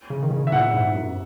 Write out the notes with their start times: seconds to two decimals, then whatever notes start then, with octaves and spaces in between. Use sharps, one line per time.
0.10 C#3
0.23 D#3
0.31 C#3
0.47 E5
0.52 A#2 F#5
0.74 G#2
0.94 F#2